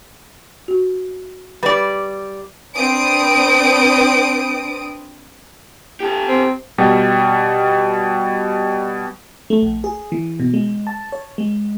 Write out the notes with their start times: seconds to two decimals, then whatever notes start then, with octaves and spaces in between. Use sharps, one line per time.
0.68 F#4
1.63 G3 B4 D5 B5
2.75 C4 D4 B4 D#6 D7
6.00 G4 A4
6.29 C4
6.78 B2 G3
9.50 A3
9.62 A#1
9.84 G#4
10.12 E3
10.40 B2
10.54 G#3
10.87 A5
11.12 C#5
11.38 G#3